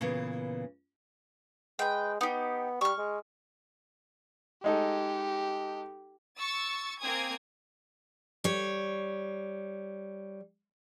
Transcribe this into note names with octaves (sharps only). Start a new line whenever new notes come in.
A#2 C#3 E3 B3
G#3 B4 G5
B3 D#4 G4
G3 C#6 F6
G#3
G#3 D#4 G4 A4
C#6 E6 A6
A#3 C4 G#5 D#6 G#6
G3 C#5